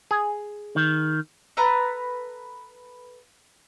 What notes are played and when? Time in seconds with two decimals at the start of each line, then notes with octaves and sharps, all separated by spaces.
0.11 G#4
0.76 D#3
1.57 A4 B4 A#5 F#6